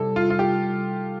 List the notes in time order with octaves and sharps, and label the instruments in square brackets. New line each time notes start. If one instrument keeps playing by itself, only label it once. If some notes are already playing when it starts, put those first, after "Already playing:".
Already playing: [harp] C3 G3 C4 E4 [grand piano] A4
[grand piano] F4
F4
G4